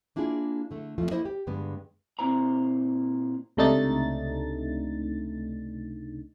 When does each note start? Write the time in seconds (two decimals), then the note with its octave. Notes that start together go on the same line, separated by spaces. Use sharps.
0.16 A#3 D4 E4 F4 G#4
0.71 D3 A3
0.98 F2 F3 A3 F4
1.11 A#3 E4 A4 C5 D#5
1.25 G4
1.47 G2 D3 G#3 B3
2.19 A#2 C4 E4 C5 A#5
3.57 C#2 C3 A3 D4 D#4 A6